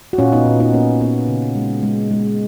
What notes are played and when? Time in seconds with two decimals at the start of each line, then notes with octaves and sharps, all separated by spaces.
0.13 F#4
0.18 A#2 C#4 F4
0.33 B3 D#4
0.46 A#2
0.60 B3 D#4
0.73 A#3 C#4
1.01 A#3 B3
1.28 C#3
1.56 G#3
1.83 G#3
2.11 G#3